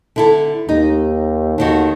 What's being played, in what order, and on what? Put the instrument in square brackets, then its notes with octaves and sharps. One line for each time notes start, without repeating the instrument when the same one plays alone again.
[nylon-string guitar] D3 E4 A4
[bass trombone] D#2 [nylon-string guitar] D#4
[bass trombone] D#2 [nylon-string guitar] D3 D#3 F#4